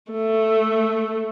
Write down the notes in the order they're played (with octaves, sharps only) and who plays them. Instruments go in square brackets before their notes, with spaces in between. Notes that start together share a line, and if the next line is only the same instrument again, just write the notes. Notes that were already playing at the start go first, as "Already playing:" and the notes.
[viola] A3